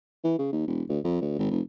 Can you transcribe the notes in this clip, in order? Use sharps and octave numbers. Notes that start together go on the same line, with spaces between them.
E3
C#3
D#2
E1
D2
F2
D2
G#1
F1